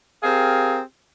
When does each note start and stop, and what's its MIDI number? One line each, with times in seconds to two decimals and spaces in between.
0.24 0.80 60
0.24 0.80 67
0.24 0.80 68
0.24 0.80 70
0.24 0.80 77